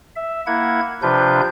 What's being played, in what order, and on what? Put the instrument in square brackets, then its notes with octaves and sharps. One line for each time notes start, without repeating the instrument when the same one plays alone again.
[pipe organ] E5
A#3 E4 F#5 G#6
C3 F3 D4 F4 B4 G6